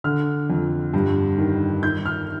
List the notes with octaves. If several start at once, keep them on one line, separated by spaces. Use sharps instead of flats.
D3 F6
F2
G2
D#3
D#3 G6
F6